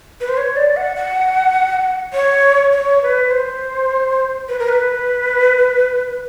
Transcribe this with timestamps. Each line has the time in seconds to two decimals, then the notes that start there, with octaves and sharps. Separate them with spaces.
0.21 B4
0.29 C5
0.37 C#5
0.56 D5
0.77 F#5
0.96 F#5
2.13 C#5
2.72 C#5
3.03 B4
3.31 C5
4.49 B4
4.59 A#4
4.69 B4